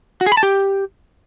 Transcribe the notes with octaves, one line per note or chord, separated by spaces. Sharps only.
F#4
G#4
B5
A5
G4